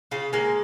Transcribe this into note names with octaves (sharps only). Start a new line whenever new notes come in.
C#3 F4
G#3 A#3